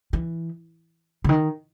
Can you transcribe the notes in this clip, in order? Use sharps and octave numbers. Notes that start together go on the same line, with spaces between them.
E3
C#3
D#3